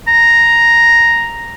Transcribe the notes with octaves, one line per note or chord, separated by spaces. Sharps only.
A#5